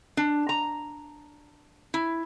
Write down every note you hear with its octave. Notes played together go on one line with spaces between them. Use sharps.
D4
A#5
E4